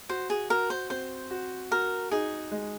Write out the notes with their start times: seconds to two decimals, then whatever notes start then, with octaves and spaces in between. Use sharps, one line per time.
0.09 F#4 C5
0.30 G#4
0.50 F#4 A#4
0.70 C5
0.90 C4 C5
1.31 F#4
1.71 F#4 A#4
2.11 D#4 G#4
2.51 G#3